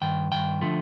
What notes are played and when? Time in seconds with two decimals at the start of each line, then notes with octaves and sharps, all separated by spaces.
0.02 G2 D#3 G5
0.32 G2 D#3 G5
0.61 D3 F3 A3